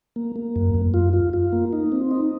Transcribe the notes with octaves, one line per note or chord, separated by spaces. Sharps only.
A#3
A#3
F#2
F#2
F4
F4
F4
A#3
D#4
C4
D#4